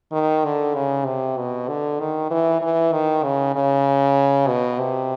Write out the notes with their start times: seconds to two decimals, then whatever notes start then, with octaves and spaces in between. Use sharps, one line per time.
0.12 D#3
0.44 D3
0.74 C#3
1.06 C3
1.38 B2
1.68 D3
2.00 D#3
2.30 E3
2.62 E3
2.93 D#3
3.23 C#3
3.55 C#3
4.48 B2
4.79 C3